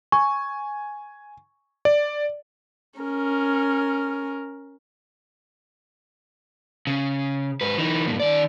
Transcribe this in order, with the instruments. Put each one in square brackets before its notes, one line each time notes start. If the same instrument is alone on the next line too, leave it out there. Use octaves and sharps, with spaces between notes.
[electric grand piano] G#5 [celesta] C#6
[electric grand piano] D5
[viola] C#4 A#4
[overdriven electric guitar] C#3
G#2 B4
E3 D#4
G2 A#2
D#3 D5